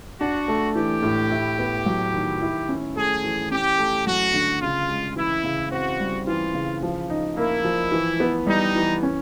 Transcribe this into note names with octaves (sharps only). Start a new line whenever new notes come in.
D4 F#4
A3
E3 G4
A2
E4
B3
F#3
D#3
E4
C#4
A3 G#4
E3
C#4 G4
A3
F#3 F#4
D3
C#3 F4
G#3
E3 E4
C#3
C4 F#4
G3
E3 F4
C#3
F3
D#4
A#3 E4
F3
E3
B3
G3 D#4
E3
C#4